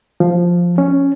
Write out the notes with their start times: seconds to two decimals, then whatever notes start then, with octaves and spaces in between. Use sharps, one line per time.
0.20 F3
0.78 C#4